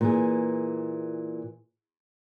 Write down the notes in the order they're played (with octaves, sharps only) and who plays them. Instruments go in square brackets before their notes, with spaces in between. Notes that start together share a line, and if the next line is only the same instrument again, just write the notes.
[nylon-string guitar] A#2 E3 G#4